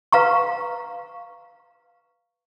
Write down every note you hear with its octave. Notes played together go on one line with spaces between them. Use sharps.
B4 F5 A#5 C#6